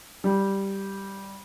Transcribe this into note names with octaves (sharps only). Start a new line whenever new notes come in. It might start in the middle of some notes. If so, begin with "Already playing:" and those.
G3